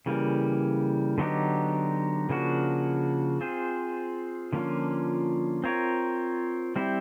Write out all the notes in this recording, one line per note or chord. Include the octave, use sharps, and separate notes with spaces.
C#3 E3 G3 A#3
D3 F#3 B3 D#4 G4
C#3 F3 A#3 D4 F#4
C4 F4 G#4 C5
D3 F3 A#3 C#4 F4
C4 F4 A#4 C#5
G3 C4 E4